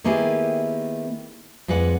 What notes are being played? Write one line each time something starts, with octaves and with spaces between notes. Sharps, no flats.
D#3 A#3 B3 E4 G4 G#4
F2 G#3 B4 D5 F#5